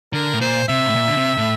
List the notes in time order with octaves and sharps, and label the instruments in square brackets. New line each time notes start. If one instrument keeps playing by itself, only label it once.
[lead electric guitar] D3 [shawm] A#4
[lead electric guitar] A2
[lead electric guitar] A#2 [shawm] C5
[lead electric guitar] C3 [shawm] E5
[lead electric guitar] A2
A#2
D3
C3
A2